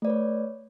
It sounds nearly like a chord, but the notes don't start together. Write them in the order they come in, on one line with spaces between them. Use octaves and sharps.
A3 D5 B4 C#5